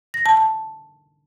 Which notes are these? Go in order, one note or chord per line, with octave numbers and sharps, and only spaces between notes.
A#6
A5
A5